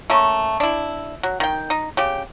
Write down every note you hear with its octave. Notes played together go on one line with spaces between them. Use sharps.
A3 A#3 C#4
D4 E4
F#3
D#3 G5
D#4
C#3 G4